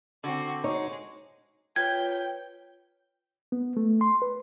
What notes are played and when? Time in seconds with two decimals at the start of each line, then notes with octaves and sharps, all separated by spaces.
0.24 D3 C4 F#4
0.64 G#3 D#4 F#4 C#5
1.76 F4 B4 C#5 G5 G#6
3.52 B3
3.77 A3
4.01 C6
4.22 B4